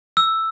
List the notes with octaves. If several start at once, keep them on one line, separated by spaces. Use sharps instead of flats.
E6